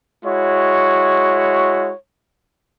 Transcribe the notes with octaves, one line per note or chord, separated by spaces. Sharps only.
G#3 E4 F#4 C#5